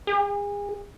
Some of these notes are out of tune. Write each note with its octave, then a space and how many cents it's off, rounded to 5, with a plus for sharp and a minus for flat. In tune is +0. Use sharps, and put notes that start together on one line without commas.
G#4 -35